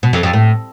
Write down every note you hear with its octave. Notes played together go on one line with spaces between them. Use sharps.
B2
F2
F2
A2